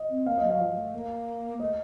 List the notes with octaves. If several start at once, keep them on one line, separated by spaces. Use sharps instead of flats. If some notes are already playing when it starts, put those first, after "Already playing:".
Already playing: D#5
C4
A#3 F5
D#5
F#3
F5
F3
A3
A#3
A3 D#5